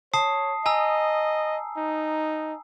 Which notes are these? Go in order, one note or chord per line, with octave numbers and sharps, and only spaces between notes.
C#5 A5 D#6 C7
D#5 G#5 A#5 E6
D#4